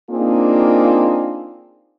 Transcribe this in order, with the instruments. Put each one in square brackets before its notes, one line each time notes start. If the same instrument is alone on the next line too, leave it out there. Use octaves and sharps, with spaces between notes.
[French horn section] A#3 C4 D4 D#4 F4 G#4